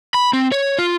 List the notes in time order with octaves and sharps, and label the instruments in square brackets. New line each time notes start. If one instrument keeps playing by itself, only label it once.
[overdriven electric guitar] B5
C4
C#5
F4